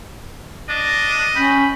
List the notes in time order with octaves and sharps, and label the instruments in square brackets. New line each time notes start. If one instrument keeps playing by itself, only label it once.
[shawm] D4 [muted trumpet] D#5
[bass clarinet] C#4 [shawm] G5 [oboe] B5